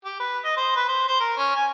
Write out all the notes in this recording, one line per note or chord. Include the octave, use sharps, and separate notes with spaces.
G4
B4
D#5
C5
B4
C5
C5
A#4
C#4
G#5